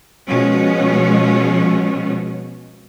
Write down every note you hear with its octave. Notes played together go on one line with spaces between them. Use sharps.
B2 F3 G#3 C#4